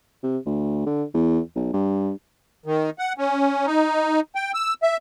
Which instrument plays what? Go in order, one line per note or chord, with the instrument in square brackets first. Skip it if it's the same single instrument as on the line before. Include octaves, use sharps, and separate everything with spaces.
[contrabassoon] C3
D2
D3
E2
B1
G2
[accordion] D#3
F#5
C#4
D#4
G5
E6
E5